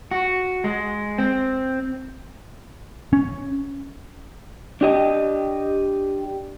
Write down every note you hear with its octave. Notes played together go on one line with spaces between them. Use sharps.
F#4
G#3
C4
C#4
D4 G4 D#5